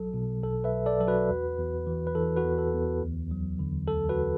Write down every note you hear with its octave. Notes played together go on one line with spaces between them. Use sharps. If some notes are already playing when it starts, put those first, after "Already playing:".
Already playing: B1 F#3 A4
B2
B1 A4
B4 E5
B1
A4 D5
F#3 A4
F#4 B4
E2
E2
E3
B4
E3 A4
F#4 B4
E2
A4
E2
D2
F#3
D3
D2 A4
F#4 B4